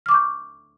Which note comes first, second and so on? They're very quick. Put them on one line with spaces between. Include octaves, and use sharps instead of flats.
F6 D6 C#6 G6